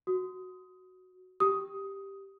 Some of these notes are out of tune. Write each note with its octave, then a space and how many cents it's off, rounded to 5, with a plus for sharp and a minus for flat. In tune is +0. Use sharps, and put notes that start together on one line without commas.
F#4 +0 D#6 +15
G4 +0 D#6 +10